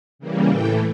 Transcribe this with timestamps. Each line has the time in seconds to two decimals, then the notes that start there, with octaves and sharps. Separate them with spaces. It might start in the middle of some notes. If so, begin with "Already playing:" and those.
0.19 C#3 E3 G3 A#3
0.49 A2 E3 A3 G5